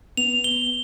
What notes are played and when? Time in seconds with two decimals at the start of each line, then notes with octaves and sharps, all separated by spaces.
0.17 B3 F7
0.44 G7